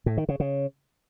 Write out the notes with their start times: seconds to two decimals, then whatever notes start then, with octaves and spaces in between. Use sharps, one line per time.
0.06 A2
0.17 D#3
0.29 C#3
0.40 C#3